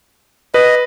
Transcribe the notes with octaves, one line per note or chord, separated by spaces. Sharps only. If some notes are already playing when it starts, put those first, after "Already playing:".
B4 D#5